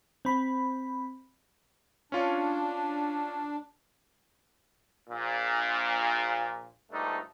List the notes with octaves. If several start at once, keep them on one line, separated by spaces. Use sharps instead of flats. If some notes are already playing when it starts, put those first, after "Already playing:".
C4 B5
C#4 D4 F4 C#5
A#1 A#2
A#1 G2 A3 D4 D#4